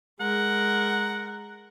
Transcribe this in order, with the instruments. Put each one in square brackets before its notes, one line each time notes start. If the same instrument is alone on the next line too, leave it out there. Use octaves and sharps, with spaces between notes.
[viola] G#3 A#4 [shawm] F#5